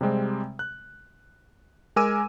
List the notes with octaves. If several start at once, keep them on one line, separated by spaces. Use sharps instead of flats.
C3 G3 G#3 C4
F#6
G#3 A#4 G#5 D6 E6 D#7